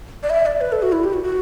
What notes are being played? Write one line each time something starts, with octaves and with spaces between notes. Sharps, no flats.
D5
E5
D5
B4
A4
F#4
E4
G4
F#4
F#4